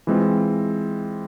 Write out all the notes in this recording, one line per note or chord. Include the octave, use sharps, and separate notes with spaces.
E3 G#3 C4 F4